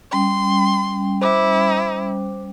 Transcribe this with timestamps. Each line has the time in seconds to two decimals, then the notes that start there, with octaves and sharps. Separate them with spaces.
0.12 G3 C#4 G5 C6
1.22 E4 C5 D6